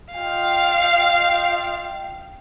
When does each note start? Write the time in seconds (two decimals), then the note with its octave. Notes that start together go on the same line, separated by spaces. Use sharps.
0.12 F4 D#5 F5 G5